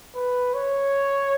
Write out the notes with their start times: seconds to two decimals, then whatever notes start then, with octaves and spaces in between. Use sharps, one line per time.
0.15 B4
0.54 C#5